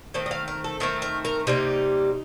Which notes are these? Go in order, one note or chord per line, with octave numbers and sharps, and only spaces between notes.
D#3 A3 C4 D#5
D#5
F5
A#4
A4
D#3 A3 C4 A#4
A#4
A#4
C3 G3 A#3 D#4